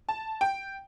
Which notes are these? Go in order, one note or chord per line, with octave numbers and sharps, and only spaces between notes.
A5
G5